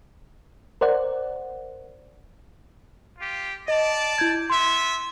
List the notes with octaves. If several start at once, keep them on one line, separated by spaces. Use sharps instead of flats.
A#4 C5 D5 F#5
F4 G4
D5 D#5 A5
E4 G6 G#6
B3 E5 C6